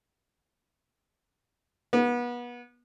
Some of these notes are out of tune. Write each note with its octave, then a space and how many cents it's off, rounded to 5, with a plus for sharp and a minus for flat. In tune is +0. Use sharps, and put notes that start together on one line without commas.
B3 -30